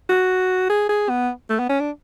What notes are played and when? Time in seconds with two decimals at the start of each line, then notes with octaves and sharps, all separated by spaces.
0.09 F#4
0.69 G#4
0.89 G#4
1.09 B3
1.50 A3
1.59 B3
1.69 C#4
1.80 D4